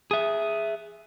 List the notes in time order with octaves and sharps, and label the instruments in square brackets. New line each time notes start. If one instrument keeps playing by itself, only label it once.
[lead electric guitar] G#4 E5